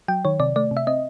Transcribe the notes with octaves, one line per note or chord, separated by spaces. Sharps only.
F#3 G5
D#3 C#5
C3 D5
A3 D5
C3
E5
C4 D#5